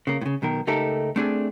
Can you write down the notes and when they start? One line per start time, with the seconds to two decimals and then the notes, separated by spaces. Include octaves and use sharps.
0.07 C#3 A#3
0.21 A2 C#3
0.42 B1 B2 D#3 A#4
0.67 C#2 A3 D#4 G4 A4 A#4
1.16 A3 C4 D4 F#4 G#4 A4